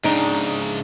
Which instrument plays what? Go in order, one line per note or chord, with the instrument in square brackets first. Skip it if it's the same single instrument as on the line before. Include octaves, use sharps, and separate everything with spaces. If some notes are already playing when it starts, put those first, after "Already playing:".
[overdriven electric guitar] G#2 C#3 [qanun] D4 G5 A#5 [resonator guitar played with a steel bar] D#4